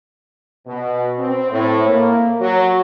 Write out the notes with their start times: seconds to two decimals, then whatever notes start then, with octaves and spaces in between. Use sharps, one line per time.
0.67 B2
1.18 C4
1.51 A2
1.88 A#3
2.41 F#3